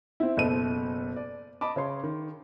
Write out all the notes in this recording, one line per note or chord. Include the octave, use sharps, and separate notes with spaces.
C4 E4
F#1 B2 A4 D#7
D5
D#5 A5 B5 D6
C#3 C#5 C6
D#3